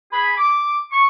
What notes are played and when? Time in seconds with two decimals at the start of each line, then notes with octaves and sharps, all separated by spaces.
0.13 G#4 B5
0.38 D6
0.91 C#6